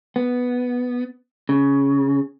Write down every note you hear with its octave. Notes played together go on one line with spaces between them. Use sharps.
B3
C#3